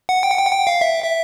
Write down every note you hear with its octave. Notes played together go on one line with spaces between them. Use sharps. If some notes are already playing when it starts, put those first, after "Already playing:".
F#5
G5
F#5
G5
F#5
G5
F5
E5
E5